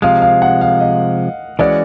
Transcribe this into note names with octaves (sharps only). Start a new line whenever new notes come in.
C3 F3 G#3 F5
F5
F#5
F5
D#5
E3 G#3 C#4 F#4 D5